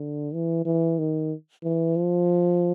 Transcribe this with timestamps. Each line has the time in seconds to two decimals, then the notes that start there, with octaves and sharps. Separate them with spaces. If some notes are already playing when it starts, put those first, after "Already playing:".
Already playing: D3
0.34 E3
0.65 E3
0.99 D#3
1.64 E3
1.97 F3